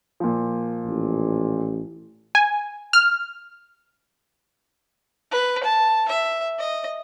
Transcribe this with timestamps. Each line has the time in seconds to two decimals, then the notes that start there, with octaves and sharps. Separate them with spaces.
0.20 A#2 F3
0.86 A1
2.35 G#5
2.93 F6
5.31 B4
5.63 A5
6.08 E5
6.59 D#5